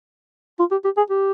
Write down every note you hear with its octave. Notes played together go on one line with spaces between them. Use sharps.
F4
G4
G4
G#4
G4